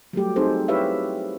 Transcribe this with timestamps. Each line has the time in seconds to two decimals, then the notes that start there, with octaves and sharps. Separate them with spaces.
0.13 F#3 G3 A3 G4
0.36 C4 D#4 G#4 A4 C5
0.68 E4 G4 B4 C#5 E5 F5